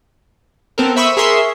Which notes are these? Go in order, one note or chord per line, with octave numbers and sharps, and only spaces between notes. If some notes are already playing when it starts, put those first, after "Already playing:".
B3 C4 A4 A#4
C5 E5 B5 C#6 D#6 E6
G#4 A#4 E5 C6 C#6